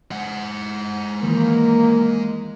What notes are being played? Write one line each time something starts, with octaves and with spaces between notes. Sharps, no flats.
G#3 F#5
D#3 E3 A#3